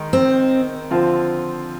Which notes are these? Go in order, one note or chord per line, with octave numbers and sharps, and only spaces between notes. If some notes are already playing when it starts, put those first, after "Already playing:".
Already playing: D#3 G#3
C4
D3 F3 C4 F4